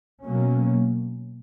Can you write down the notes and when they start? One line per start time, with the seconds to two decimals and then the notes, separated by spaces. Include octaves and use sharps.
0.23 B2 F#3 A#3 C#4